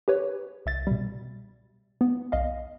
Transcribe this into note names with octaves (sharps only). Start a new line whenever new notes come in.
G4 B4 C#5
C2 E5 A6
B2 G3
B3
B1 D#5 F5